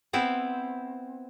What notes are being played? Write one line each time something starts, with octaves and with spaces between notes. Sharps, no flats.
B3 C4 E4